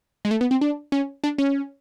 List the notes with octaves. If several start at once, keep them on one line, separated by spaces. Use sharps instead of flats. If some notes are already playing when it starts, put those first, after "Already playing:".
G#3
A3
B3
C4
D4
C#4
D4
C#4